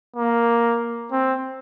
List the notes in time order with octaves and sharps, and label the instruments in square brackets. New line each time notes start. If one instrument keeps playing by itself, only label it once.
[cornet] A#3
C4